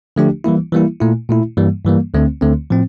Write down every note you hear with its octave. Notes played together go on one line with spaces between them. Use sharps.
D3 F3 A3 D4 G4
E3 G3 A#3 E4
E3 G3 A#3 E4
A#2 A3 E4
A#2 A3 E4
G2 E3 G3 A#3
G2 E3 G3 A#3
D2 D3 A3 C4
D2 D3 A3 C4
A2 F3 C4